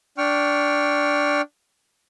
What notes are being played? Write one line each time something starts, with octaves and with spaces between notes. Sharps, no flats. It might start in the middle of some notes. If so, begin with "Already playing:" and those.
D4 G5 C#6 F6